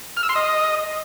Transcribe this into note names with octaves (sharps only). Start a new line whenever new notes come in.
F6
E6
C6
D#5